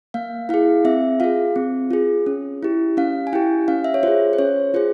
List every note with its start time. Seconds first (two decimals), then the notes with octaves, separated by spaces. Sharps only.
0.14 A#3 F5
0.49 E4 G#4 F5
0.85 C4 E5
1.20 F4 G#4 F5
1.56 C4
1.91 F4 G#4
2.26 C#4
2.63 E4 G4
2.97 C#4 F5
3.27 G#5
3.33 E4 G4 G5
3.68 C#4 F5
3.84 E5
3.94 C#5
4.03 F4 G#4 C5
4.33 C5
4.39 C#4 C#5
4.74 F4 G#4 C5